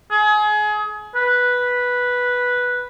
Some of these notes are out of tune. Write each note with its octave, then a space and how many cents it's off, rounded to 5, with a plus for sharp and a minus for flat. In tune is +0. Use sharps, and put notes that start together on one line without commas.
G#4 +30
B4 -5